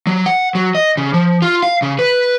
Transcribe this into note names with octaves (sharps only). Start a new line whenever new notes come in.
F#3
F#5
F#3
D#5
C#3
F3
F4
F5
C#3
B4